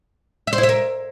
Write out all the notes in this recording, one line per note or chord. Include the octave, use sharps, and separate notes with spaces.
E5
C5
E4
E5
A#4